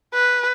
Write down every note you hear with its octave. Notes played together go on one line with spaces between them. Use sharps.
B4